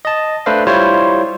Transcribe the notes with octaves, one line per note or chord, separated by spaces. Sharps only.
D#5 A5
A3 D4 B4 C5 E5 F5
G3 E4 F4 C5 C#5